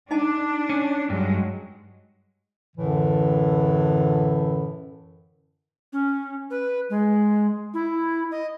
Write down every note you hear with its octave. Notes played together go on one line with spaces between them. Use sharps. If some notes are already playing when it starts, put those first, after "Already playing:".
D4 D#4 D#5 A5
C#4
G2 F#3 G#3
F#2 A2 D3 E3
C#4
B4
G#3
E4
D#5